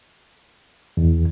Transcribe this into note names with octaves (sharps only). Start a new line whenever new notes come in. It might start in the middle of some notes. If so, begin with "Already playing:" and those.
E2